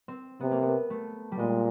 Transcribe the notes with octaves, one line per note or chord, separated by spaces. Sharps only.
C4
C3 B3
A#3
B3
A3
G3
A#2 G#3